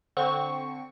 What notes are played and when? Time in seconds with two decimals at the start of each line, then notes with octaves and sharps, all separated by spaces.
0.17 D3 C4 C#6